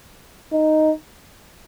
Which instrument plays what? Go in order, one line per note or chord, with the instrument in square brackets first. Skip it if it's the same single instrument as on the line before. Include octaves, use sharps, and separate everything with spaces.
[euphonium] D#4